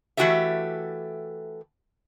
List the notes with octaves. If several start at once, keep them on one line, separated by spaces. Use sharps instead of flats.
E3 A3 F#4 G4 A4 E5